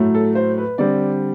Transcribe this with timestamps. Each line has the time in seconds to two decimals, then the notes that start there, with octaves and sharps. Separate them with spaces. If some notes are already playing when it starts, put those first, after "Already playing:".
Already playing: A2 F#3 A3
0.15 A4
0.35 C5
0.58 B4
0.78 D3 G3 C4 D5